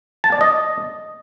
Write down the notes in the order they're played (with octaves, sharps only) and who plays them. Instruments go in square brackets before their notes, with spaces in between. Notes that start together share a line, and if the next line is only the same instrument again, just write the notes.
[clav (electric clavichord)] A5
D5
D#5